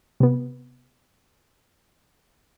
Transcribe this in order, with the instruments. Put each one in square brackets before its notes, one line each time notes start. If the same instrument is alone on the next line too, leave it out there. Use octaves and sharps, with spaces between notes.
[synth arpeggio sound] C3 B3